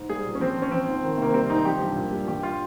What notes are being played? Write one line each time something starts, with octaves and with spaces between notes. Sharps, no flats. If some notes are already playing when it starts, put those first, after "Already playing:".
Already playing: G#2
G3 G#4
A#2
C#4
F3 C4
F3
C#4
F3 C4
G#2
D#3
C3 A#3
G3 C4
G#2 D#4
F3 G4
G2
A#2
G3
G2 G4
F4